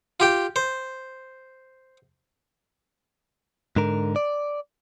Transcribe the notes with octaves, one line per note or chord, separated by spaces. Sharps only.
F4 G4 G5
C5
G#2 D3 A#4
D5